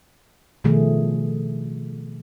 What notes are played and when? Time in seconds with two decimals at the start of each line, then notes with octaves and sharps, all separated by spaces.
0.64 B2 D#3 F3 A3 G#4